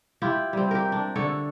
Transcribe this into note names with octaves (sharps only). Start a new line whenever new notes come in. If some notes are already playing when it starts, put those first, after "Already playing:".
E4 F4 G4
G3 C4
G4 A#4
D4
D3 D4 A4 C#5